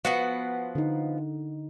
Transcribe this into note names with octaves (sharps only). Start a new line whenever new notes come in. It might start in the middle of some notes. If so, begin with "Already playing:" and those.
F3 B3 F#4 F#5
D3 D#4